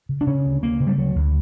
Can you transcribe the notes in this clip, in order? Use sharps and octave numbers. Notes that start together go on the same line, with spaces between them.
C#3
D4
C#3 C#4
D2
D2 A#3
C#3
G3
D2 F#3
D2